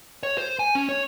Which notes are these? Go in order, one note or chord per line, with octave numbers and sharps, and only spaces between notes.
C#5
C5
G#5
C#4
C#5